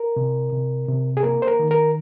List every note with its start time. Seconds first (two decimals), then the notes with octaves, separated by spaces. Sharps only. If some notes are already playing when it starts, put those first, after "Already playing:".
Already playing: A#4
0.16 C3
0.52 C3
0.88 C3
1.17 G#4
1.23 A#3 A#4
1.42 C5
1.48 A#4
1.59 D#3
1.71 A#4